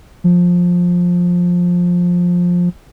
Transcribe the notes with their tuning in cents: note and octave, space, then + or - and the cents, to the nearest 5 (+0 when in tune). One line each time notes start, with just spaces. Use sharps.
F3 +15